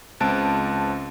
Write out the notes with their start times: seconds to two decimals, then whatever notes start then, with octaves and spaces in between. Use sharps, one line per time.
0.20 C#2 C4 A5 F#6 D7